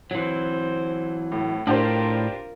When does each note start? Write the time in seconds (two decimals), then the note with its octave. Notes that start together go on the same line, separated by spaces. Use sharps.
0.11 E3 F#3 C4 C5
1.32 A2
1.67 A2 D4 F4 G4 A#4 C5